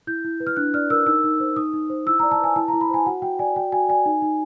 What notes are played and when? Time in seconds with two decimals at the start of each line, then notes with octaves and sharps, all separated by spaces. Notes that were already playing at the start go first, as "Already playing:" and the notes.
0.07 E4 G6
0.24 E4
0.40 B4
0.47 F6
0.57 D4 F#6
0.74 D5 F6
0.90 A#4 E6
1.06 D#4 E6
1.24 D#4
1.40 C5
1.56 D#4 D#6
1.73 D#4
1.90 C5
2.06 E4 E6
2.19 D5 A#5
2.32 A5
2.40 B4 G#5
2.56 E4 A5
2.68 A#5
2.73 E4
2.81 B5
2.89 C5 G#5
3.06 F#4 F#5
3.22 F#4 G5
3.39 D5 G#5
3.56 F#4 G5
3.72 F#4 G#5
3.88 D5 G#5
4.05 D#4
4.22 D#4